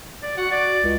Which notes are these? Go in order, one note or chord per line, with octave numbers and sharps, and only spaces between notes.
D5
F#4 F#5
D5
C#2